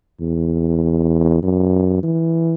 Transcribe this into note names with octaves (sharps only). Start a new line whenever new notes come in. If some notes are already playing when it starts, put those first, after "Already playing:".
E2
F#2
E3